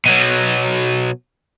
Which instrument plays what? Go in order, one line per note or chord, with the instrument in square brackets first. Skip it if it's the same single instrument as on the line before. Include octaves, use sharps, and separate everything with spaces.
[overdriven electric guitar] B2 F#3